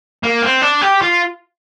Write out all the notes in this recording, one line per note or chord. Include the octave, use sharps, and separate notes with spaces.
A#3
C4
D4
G4
F4